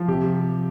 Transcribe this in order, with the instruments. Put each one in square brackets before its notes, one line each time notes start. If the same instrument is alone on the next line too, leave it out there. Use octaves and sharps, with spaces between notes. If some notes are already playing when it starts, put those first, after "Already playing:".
Already playing: [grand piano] F3
C3 G4